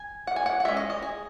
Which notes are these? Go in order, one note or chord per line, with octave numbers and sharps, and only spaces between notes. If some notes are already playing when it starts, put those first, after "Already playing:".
Already playing: G#5
F#5
G#5
F#5
F#5
G#3 C#4 E5
D#5
D#5
G#4